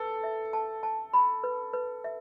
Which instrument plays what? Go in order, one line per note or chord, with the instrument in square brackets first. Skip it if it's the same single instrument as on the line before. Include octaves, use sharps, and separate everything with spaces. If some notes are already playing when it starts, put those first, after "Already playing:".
Already playing: [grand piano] A4 [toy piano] B4
[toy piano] E5
A5
A5
B5
B4
B4
E5